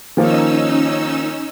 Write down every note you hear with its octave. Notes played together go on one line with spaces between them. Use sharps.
D#3 F3 A#3 C#4 D#4 E6